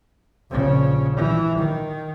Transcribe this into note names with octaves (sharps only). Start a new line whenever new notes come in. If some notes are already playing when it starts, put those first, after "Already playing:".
A#1 C#3
E3
D#3